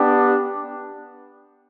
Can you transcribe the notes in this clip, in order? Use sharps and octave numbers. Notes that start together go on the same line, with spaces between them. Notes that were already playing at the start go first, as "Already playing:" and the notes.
Already playing: B3 D4 G4